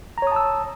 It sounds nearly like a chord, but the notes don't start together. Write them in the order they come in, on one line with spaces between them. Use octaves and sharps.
A#5 C#5 D#6 A5 E6